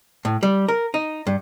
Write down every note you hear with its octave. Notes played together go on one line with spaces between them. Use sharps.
A2
G3
A#4
D#4
G2